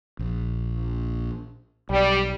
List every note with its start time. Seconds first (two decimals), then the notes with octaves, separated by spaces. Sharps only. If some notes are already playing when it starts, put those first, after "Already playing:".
0.19 A#1
1.90 B1 G3